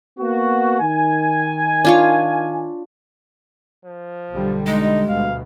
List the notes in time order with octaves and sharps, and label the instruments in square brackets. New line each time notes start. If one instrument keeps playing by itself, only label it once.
[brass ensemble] A#3 B3 F#4
D#3 G#5
[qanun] D4 F4 C#5
[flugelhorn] F3
[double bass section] B1 D3 G3
[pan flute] G#3 [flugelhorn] D#4
[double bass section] D2 B2 [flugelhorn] F5